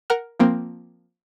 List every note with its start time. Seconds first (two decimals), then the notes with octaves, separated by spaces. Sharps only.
0.10 A#4 F#5 F6
0.39 F3 A#3 C4